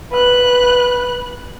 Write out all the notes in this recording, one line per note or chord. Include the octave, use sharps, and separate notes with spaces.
B4 F#6